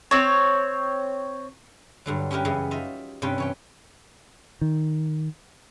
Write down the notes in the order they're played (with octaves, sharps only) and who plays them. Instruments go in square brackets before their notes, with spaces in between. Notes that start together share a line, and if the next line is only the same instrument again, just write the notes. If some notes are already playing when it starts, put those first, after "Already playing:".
[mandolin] C4 C#5
[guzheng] G2 D3 F#3
C#4 E4 G4 A#4 B4
F#2 C#3 E3 G4
D#4 F4 D#5 E5
G2 C3 C#4 B4 G5
E3 C#5 G5
[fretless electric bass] D#3